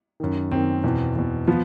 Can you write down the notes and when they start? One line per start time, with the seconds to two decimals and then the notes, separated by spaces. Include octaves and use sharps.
0.20 F#2 D#3
0.51 F#2 D#3 C4
0.84 E2 B2
1.16 E2 B2
1.47 F3 B3